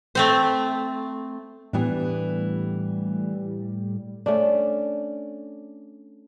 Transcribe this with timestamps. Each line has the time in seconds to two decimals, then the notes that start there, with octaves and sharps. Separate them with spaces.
0.15 A3 C4 C5
1.73 A2 E3 G3 B3 D4
4.26 A3 C#4 D4